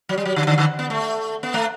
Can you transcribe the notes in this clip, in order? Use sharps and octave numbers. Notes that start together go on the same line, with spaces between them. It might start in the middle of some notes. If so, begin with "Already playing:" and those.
F#3
G3
F#3
D3
D3
D3
B3
A3
B3
A3